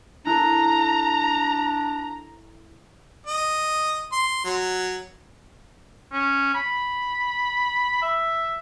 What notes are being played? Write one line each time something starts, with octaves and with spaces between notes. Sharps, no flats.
D4 E4 A4 A#5
D#5
C6
F#3
C#4
B5
E5